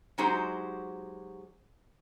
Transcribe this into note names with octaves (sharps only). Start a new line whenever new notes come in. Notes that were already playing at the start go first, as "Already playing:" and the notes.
F#3 G#3 D#4 F#4 G4 C5